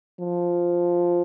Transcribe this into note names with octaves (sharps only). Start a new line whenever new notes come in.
F3